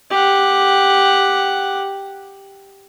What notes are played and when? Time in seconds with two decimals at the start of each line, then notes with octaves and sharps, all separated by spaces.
0.11 G4 F#5